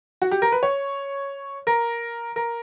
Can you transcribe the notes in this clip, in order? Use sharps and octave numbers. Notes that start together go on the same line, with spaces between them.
F#4
G4
A#4
B4
C#5
A#4
A#4